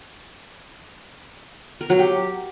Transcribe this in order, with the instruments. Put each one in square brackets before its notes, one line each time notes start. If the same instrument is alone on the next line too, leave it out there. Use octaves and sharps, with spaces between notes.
[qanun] A#4
F#3
G4